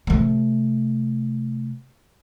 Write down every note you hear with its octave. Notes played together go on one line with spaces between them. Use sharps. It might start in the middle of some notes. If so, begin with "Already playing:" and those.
C3 A3